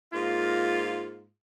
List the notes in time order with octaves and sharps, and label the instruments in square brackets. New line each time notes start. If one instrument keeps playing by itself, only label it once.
[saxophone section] G#2 A#3 F4